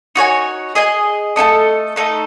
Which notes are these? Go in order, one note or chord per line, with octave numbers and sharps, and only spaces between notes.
D#4 F#4 C#5 G#5
G#4 D#5 G#5
A3 D#4 A4 D#5
A3 D#4 A4